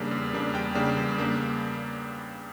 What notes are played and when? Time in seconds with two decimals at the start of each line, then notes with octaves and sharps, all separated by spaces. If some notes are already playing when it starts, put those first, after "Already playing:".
Already playing: E2 C#3 G3 A#3 D4
0.11 E2
0.33 C#3 G3 A#3 D4
0.53 E2 G5
0.75 C#3 G3 A#3 D4
0.97 E2
1.18 C#3 G3 A#3 D4